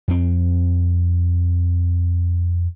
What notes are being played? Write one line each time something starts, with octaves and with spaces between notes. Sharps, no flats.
F2 C4